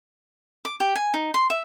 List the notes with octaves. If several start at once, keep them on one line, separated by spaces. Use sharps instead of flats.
D6
G4
G#5
D#4
C6
E5